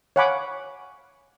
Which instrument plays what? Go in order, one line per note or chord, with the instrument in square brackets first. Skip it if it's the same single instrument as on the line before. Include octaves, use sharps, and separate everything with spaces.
[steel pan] C#5 F5 F#5 G#5 B5 D6